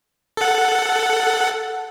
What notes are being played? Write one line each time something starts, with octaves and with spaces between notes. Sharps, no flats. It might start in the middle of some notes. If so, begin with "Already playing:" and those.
A4 F#5